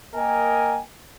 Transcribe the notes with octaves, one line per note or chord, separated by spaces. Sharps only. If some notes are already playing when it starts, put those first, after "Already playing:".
A#3 A#4 D#5 G5 G#5